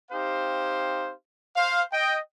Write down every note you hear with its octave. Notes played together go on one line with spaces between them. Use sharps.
C4 D#4 G4 C5 F5
C5 F5
D#5 G5